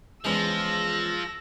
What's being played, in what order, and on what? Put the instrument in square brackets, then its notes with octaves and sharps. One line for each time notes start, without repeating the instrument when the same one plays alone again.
[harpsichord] E2 C#3 G#3 [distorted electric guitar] F3 [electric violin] E6 A#6